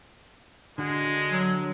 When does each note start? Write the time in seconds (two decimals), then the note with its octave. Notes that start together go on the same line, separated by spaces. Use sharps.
0.78 D3 G#3 D4 F#4
1.31 F#3